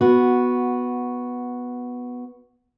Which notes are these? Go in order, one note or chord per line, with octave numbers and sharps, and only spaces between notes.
B3 F#4